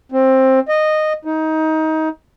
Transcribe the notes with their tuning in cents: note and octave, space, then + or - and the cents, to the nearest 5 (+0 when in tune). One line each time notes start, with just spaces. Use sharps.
C4 +15
D#5 -15
D#4 +20